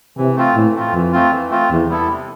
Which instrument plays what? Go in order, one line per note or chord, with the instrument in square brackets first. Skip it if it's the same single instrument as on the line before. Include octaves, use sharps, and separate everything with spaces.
[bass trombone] C3 [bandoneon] E3
[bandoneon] A3 C4 F4
[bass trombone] A2 [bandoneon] E3
[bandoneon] A3 C4 F4
[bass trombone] F2 [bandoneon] E3
[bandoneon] A3 C4 F4
E3
A3 C4 F4
[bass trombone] E2 [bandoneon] C3
[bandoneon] G3 B3 E4 A4
C3